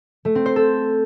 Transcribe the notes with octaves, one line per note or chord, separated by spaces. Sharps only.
A3
C4
C5
A4